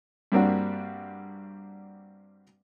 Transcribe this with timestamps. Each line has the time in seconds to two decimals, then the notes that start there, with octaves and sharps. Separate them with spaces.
0.32 G2 G3 A#3 C4 D4 F#4